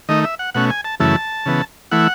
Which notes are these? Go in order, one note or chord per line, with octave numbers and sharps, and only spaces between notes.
D#3 A3 D#4 D#5
E5
F#5
B2 A3 C#4 F#5
G#5
A5
F#2 C#3 E3 A3 E4 A5
C#3 E3 B3
E3 A3 E4 F#5